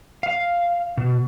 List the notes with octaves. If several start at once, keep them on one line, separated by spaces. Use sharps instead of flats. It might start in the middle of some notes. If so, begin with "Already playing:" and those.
F5
B2